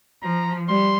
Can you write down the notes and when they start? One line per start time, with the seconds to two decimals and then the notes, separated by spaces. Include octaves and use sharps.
0.22 F3 A#5
0.68 G3 C6